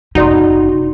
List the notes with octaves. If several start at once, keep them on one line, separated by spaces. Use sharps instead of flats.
F#1 C3 D#4 F#4 D5 C6